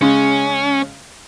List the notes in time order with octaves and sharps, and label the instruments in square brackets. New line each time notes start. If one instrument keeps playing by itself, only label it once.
[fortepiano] C#3 G#3 [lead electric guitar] C#4